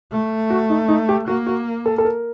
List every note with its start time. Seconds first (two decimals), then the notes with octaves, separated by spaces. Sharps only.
0.11 A3
0.50 F#4
0.70 D#4
0.88 D#4
1.09 G4
1.28 A#3 F#4
1.46 F#4
1.86 A4
1.98 A4
2.05 A#4